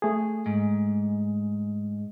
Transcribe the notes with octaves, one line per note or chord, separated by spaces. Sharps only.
A3 G#4
G#2